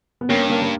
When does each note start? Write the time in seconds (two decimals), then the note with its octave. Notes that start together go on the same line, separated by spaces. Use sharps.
0.21 B3
0.29 G2 A#3 C#4
0.49 A#3 C#4
0.62 A#3